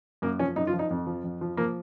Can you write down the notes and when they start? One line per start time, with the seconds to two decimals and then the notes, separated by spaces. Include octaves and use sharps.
0.22 F#2 A#3
0.39 F3 C#4
0.56 F#2 D#4
0.67 F4
0.73 F3
0.79 D#4
0.91 F2
1.06 F3
1.24 F2
1.41 F3
1.57 F3 A#3